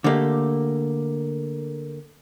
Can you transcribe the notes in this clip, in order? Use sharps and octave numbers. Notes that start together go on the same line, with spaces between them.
D3 A3 A#3 G4